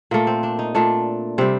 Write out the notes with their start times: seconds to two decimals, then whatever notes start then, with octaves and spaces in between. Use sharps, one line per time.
0.11 A#2 A3 A#3
0.27 C4
0.43 D4
0.59 D#4
0.75 A#2 A3 D4
1.38 C3 G3 C4